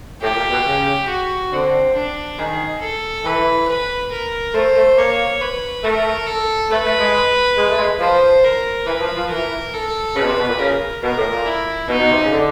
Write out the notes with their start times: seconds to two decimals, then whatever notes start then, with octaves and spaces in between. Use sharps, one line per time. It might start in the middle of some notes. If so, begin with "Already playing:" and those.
0.22 A2 G4
0.36 A#2
0.50 B2
0.65 C#3
1.08 F#4
1.52 D3 C4
1.95 D4
2.38 D#3 G#4
2.81 A4
3.24 E3 B4
3.68 B4
4.12 A#4
4.54 A3 C5
4.76 A3
4.97 A#3 C#5
5.41 B4
5.84 A3 A#4
6.26 A4
6.70 A3 B4
6.85 A3
7.00 G#3
7.57 G#3
7.69 A3
7.78 G#3
8.00 F3 C5
8.44 A#4
8.86 E3 B4
9.01 F3
9.16 F3
9.29 E3 A#4
9.73 A4
10.16 C#3 B4
10.22 B2
10.27 C3
10.38 B2
10.48 A#2
10.59 C#3 A#4
11.03 B2 A#4
11.17 A2
11.31 A#2
11.46 E4
11.89 B2 D#4
12.00 B2
12.11 C3
12.22 C#3
12.32 D3